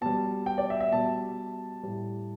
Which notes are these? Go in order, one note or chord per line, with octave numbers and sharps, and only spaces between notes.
B2 G3 A5
G5
D5
E5
E5
B2 G3 A5
A2 G3